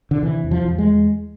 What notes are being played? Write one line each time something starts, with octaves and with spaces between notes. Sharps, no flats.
D3
C3 E3
E2
F3
E2 F3
G#3